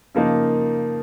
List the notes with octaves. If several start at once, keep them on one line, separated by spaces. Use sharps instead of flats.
C#3 F3 A#3 D#4